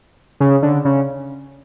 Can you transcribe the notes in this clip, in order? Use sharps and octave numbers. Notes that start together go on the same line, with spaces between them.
C#3
D3
C#3